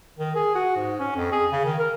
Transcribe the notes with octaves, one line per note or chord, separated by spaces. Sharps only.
D#3
G#4
F#4
G#2
C#4
F2
G#4
C#3
D#3
A#4